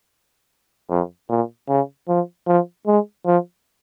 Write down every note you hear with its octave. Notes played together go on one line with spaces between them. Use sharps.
F2
A#2
C#3
F3
F3
G#3
F3